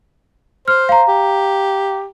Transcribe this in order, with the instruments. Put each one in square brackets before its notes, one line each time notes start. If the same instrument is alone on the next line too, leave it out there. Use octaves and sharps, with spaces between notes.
[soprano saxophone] C5 [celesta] F6
[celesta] F5 A#5
[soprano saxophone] G4